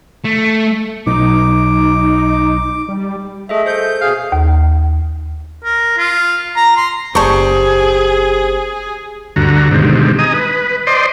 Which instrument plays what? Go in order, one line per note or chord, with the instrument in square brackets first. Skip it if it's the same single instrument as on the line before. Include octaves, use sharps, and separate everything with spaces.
[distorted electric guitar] A3
[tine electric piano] B1 [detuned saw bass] D#4 [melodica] D6
[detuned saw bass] G3
[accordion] A3 [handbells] G#4 D#5 E5
[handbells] A4 C5 [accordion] G6
[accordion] B2 G#4 [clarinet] F5
[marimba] D#2
[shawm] A#4
F4
A#5
C6
[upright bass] F#1 A#3 [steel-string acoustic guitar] G4 C5 [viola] G#4 [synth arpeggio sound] D5 A5 C#6
[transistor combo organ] D2 G2 D3 F#4 A#5
B2 D3 D#3 G3 G#3 C4
D#5 G#5 A#5 D#6
B4
C5 D5 D#5 C6